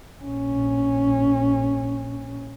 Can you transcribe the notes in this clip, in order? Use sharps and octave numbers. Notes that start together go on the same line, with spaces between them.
A#1 C#4